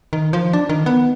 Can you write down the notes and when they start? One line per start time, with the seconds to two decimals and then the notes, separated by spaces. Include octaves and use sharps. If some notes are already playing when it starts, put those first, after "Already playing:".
0.13 D#3
0.33 F3
0.53 D4
0.69 D#3
0.86 B3